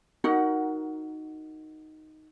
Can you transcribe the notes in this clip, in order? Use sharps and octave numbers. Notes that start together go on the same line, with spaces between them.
D#4 F#4 A#4 F#5